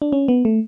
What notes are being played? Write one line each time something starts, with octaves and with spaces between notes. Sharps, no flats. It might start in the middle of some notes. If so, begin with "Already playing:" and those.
D4
C#4
B3
A3